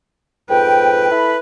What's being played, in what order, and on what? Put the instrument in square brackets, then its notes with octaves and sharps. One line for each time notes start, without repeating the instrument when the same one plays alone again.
[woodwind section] F2 G#2 G5 [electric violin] B4
[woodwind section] E4 A4 B5